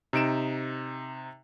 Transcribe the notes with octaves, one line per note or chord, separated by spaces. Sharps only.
C3 D#4 D7 E7